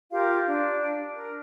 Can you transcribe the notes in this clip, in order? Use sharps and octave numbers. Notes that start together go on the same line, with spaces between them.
F4 G4 A#4 F5
D4
A#4